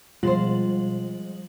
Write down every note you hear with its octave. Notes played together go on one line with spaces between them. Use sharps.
B2 F3 G3 G#3 F4 C5 F#7